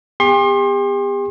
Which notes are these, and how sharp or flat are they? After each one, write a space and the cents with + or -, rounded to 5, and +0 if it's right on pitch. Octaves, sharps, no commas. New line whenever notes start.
B3 +0 G4 +40 C6 +35